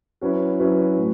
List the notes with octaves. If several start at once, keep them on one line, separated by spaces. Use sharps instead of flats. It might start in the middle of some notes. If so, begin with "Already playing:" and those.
F#3 C#4 E4 B4
F#3 C#4 E4 B4
A2